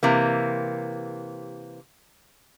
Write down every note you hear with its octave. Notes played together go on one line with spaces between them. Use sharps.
C3 E3 A#3